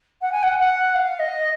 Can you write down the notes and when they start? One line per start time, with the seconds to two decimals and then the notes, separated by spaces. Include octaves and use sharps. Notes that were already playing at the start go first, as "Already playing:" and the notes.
0.21 F#5
0.32 G#5
0.43 F#5
0.58 F#5
0.95 F5
1.19 D#5